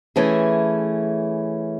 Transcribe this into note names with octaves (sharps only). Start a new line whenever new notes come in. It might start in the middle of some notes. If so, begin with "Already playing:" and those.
E3 A3 C#4 G#4